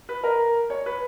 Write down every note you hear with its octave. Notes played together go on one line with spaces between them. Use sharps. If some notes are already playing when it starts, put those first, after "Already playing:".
B4
A#4
C#5
B4